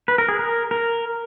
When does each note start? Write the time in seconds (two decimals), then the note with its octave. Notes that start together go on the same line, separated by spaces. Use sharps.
0.08 B4
0.18 A#4
0.28 G#4
0.39 A#4
0.71 A#4